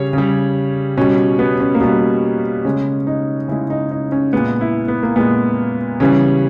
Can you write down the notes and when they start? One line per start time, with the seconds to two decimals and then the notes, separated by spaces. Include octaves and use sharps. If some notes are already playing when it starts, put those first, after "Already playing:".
Already playing: C#3 G3 C#5
0.13 C#3 G3
0.98 B2 G3 C#4
1.39 B3
1.60 C#4
1.74 A#3
1.81 B2 G3 B3
2.65 C#3 G#3 C#4
3.07 D#4
3.48 C#3 G#3 E4
3.70 D#4
3.91 D#4
4.12 C#4
4.33 A#2 G#3 B3
4.61 E4
4.88 B3
5.03 A#3
5.16 A#2 G#3 B3
6.00 C#3 E3 G3 C#4